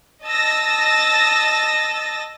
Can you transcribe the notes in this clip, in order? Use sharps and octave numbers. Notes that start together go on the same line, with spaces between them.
D#5 A5 E6 A6 A#6